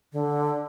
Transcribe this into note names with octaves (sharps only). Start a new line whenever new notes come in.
D3